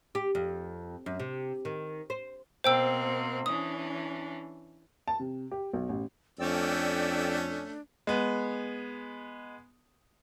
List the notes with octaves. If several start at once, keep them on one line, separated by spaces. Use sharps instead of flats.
G4
F2
F#2
C3
D#3
C5
B2 A#3 C4 C5 G5 E6
E3 C#4 D4 D#6
A5
C3
G4
B1
A1
F2 A3 C#4 D4 D5 G5 E6
G#3 B3